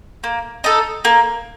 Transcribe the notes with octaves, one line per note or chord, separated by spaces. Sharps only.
A#3
D#4 A4
A#3